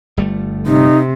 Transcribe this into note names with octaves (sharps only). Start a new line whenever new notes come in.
G1 G3 A3
C3 D#4